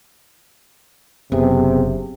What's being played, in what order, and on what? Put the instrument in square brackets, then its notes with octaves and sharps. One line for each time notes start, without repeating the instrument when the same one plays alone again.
[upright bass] F#1 [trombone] C3 [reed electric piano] B3 G#4